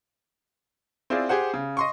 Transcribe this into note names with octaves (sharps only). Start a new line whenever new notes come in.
C4 E4 F4 G#4 D5
G4 G#4 C5 F#5
C#3
D#5 C6 C#6